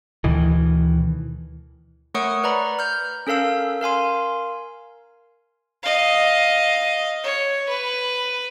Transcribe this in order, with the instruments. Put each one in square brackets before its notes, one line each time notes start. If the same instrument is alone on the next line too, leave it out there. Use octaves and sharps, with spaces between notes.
[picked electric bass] D2 B2 D#3 E3
[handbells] A3 A#4 C#5 F#5 C#6 D#6
B4 D5 A#5 B5
F6 G6
C#4 A4 A#4 F5 E6
A#4 F5 G#5 C6
[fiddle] D#5 F5
C#5
B4